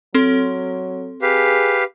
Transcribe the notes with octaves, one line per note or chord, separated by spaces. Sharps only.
F#3 C4 A4 C6
G4 G#4 B4 F5